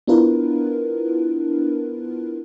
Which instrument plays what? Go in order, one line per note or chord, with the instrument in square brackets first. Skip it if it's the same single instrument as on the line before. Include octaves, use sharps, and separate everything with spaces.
[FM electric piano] B3 D4 E4 F4 A#4 B4